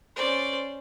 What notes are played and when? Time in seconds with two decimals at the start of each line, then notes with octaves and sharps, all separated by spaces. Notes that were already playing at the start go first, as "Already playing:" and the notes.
0.16 C#4 C5 D5